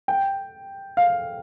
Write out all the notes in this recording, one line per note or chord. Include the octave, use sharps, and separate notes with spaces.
G5
F5